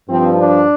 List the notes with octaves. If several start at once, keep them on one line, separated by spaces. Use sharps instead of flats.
G2 F3 C4
D4